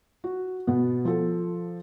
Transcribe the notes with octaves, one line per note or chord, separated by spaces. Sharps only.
F#4
B2 B3
F3 A4